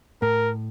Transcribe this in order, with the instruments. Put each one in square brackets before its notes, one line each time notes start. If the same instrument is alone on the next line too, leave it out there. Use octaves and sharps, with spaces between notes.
[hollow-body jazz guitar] A2 [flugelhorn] A#4